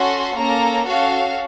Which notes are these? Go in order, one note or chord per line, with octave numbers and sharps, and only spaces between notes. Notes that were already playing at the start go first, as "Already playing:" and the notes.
Already playing: C#4 F#4 A4 C6
A#3 C#4 A4 A#5
C#4 F#4 A4 F5